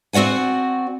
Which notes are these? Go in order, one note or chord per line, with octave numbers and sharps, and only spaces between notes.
C4 F#4 D5 F#5 G#5